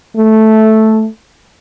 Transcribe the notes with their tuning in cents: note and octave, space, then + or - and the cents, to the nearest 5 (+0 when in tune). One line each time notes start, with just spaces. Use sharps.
A3 -5